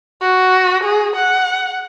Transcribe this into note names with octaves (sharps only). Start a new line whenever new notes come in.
F#4
G#4
F#5